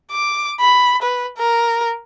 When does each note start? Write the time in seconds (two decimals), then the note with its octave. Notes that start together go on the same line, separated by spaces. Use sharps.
0.11 D6
0.60 B5
1.02 B4
1.38 A#4